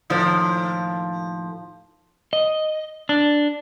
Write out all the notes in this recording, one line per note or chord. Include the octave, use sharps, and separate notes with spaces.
D#2 A2 F3
D#5
D4